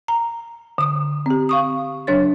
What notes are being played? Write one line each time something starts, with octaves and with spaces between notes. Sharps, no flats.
A#5
D3 D#6
C4 G4
F5 C#6 D#6
C#3 F#3 D4 C#5 A6